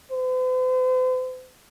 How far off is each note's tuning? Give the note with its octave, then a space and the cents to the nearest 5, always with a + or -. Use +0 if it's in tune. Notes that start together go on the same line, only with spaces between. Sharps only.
C5 -45